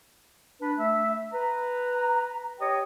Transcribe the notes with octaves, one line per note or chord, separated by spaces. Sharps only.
D4 B4
A3 E5
B4 A#5
G4 C#5 D#5 G5